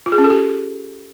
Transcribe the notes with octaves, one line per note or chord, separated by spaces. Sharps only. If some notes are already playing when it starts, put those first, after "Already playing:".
F4
G#4
C#4
A4
G4